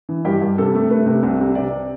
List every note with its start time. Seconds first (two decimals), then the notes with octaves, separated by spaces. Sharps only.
0.09 E3
0.25 G2 G4
0.42 G2
0.58 C3 A4
0.75 A3
0.90 A3 B4
1.06 C3
1.23 C2
1.40 C3
1.55 C3 D5